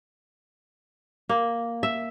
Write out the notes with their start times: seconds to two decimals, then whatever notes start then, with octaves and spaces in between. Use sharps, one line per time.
1.29 A#3
1.83 E5